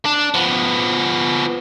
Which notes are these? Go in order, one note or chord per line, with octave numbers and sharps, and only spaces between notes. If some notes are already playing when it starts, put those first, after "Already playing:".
D4
F3 B3